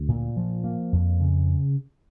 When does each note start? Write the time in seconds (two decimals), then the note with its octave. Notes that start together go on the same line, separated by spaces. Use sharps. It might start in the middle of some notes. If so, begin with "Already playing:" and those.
Already playing: D2
0.09 A#2
0.37 F3
0.64 A#3
0.93 F2
1.20 C#3